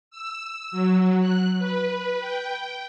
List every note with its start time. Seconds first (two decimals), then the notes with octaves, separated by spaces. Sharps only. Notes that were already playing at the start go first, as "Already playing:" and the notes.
0.11 E6
0.72 F#3
1.20 F#6
1.59 B4
2.20 G5